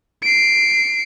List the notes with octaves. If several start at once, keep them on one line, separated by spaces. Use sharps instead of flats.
C7 D7